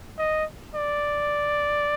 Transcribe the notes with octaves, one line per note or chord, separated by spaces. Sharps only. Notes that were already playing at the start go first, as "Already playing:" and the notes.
D#5
D5